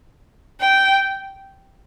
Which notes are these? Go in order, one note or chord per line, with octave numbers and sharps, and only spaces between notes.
G5